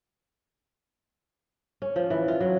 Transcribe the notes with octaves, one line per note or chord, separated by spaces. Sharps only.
C#4
F3
E3
F4
F#3